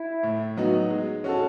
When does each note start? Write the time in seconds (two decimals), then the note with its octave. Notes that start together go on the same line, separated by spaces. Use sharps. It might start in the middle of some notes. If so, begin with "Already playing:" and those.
Already playing: E4
0.23 A2
0.57 F#3 B3 D#4 F#4
0.90 G#3
1.24 C#4 F#4 A4